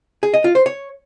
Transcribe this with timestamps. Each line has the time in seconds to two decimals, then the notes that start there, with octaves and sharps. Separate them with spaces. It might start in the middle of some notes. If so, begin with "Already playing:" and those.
0.23 G#4
0.34 D#5
0.44 F4
0.55 C5
0.66 C#5